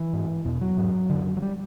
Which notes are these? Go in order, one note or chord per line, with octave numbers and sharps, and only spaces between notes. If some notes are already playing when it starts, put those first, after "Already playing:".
Already playing: E3
G#2
E2 B2
F#3
G#2
F#2 D3
F#3
G3